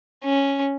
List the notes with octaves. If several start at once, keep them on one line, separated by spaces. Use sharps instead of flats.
C#4